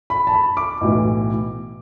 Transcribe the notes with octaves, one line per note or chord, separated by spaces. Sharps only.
B5
A5
B5
D6
B1 A2 E3